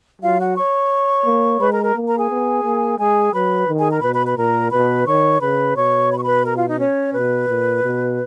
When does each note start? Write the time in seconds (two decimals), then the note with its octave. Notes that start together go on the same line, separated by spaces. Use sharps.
0.22 F#3 F4 F5
0.39 F#4 F#5
0.56 C#5 C#6
1.26 A#3
1.60 G#3 B4 B5
1.72 A#4 A#5
1.83 A#4 A#5
1.94 A#3
2.07 A#4 A#5
2.17 G#4 G#5
2.30 B3
2.64 A#3
2.99 G#3 G#4 G#5
3.33 F#3 B4 B5
3.68 D#3
3.79 G#4 G#5
3.91 A#4 A#5
4.02 B2 B4 B5
4.14 B4 B5
4.26 B4 B5
4.37 A#2 A#4 A#5
4.71 B2 B4 B5
5.06 D#3 C#5 C#6
5.41 C#3 B4 B5
5.76 B2 C#5 C#6
6.11 B5
6.18 C#6
6.25 B4 B5
6.46 A#4 A#5
6.56 F4 F5
6.68 D#4 D#5
6.79 C#4 C#5
7.14 B2 B4
7.48 A#2
7.84 B2